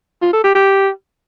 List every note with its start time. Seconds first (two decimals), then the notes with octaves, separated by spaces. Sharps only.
0.22 F4
0.33 A4
0.44 G4
0.55 G4